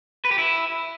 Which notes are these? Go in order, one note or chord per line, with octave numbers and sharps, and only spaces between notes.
B4
G4
E4